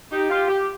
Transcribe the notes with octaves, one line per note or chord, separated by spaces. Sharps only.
D#4 G4
F4
G4